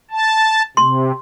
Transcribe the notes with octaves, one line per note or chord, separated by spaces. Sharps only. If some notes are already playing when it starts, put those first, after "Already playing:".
A5
C3 C6